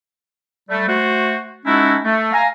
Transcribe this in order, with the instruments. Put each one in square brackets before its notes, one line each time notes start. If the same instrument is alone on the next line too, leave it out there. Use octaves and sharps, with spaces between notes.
[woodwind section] G3 A3
A3 F#4 C5
G#3 C#4 D#4 E4 F#4 A4
A3
F5 G#5 A#5